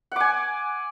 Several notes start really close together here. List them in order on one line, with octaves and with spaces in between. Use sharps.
F#5 D6 G#5